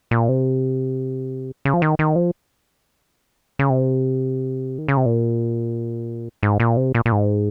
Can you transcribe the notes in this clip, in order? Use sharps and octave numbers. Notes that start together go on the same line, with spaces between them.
A#2
C3
C#3
F3
D#3
D#3
F3
C#3
C3
D#3
C#3
C3
A#2
G#2
A#2
C3
A#2
A#2
G#2